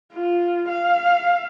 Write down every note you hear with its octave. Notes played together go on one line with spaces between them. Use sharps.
F4
F5